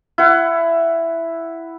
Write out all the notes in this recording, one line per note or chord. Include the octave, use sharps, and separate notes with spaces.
E4 F#5